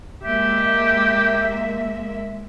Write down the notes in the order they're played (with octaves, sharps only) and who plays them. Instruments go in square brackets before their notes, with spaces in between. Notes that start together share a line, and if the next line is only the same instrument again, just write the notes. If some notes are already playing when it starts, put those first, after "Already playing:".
[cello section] G#3 A#3 E5 [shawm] G4